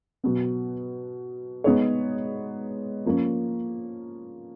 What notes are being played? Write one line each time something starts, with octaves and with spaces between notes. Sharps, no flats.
B2 F#3 B3
G#3 B3 D#4 G#4 C#5
F3 A#3 C#4